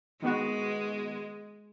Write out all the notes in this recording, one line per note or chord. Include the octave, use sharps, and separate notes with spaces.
D#3 G#3 B3 F#4